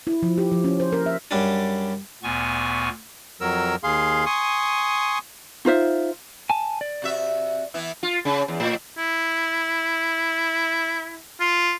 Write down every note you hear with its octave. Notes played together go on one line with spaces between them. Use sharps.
E4
F3
G4
F3
C#4
C5
A#4
E5
F#2 G3 D4
D2 A#2 B3 G#5 C#6
F2 F#3 A#4 E6
D#2 G#4 F5 C6
G#5 C6 C#6 D#6
D#4 F4 C5 E5
G#5 A5
D5
C3 F#4 E5
E3 B3 E4
F4
C#3
E2
A2
E4
F4